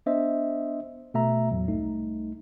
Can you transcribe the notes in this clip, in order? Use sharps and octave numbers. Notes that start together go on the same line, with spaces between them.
B3 D4 C5 D#5 E5
B2 A3 E5 A#5
E2 A2 F#3
C2 A3 D#4